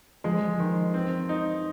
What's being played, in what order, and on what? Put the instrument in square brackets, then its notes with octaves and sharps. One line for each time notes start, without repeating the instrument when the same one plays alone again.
[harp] F3 [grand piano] G#3
[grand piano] D#3
C4
D#4